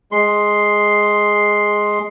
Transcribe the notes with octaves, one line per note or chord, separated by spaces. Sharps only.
G#3 C6